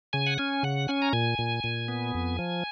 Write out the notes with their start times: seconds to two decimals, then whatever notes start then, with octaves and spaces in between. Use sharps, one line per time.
0.13 C#3 G#5
0.27 F#5
0.38 C#4 G#5
0.63 C#3 F#5
0.88 C#4 G#5
1.02 A#5
1.13 A#2 G#5
1.39 A#2
1.64 A#2
1.88 B3
2.14 F2
2.39 F3